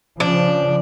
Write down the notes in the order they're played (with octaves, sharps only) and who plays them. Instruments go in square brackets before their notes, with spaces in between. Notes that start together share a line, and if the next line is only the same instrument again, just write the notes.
[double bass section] C#3 F3 [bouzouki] D4